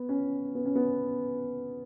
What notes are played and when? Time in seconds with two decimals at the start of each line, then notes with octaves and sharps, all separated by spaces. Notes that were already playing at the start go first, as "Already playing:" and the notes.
Already playing: B3
0.09 C#4
0.55 B3
0.65 C#4
0.75 B3